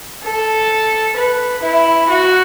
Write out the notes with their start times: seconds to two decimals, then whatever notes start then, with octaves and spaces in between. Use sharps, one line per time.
0.23 A4
1.17 B4
1.63 E4
2.09 F#4